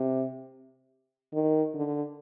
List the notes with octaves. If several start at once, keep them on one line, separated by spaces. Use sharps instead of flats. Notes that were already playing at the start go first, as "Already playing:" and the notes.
Already playing: C3
D#3
D3